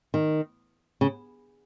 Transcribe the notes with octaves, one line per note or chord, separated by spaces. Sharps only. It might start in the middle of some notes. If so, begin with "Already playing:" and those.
D#3
C#3